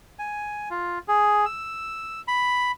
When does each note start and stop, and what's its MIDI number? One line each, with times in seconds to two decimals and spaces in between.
0.19 0.69 80
0.70 0.99 65
1.08 1.45 68
1.46 2.22 88
2.28 2.72 83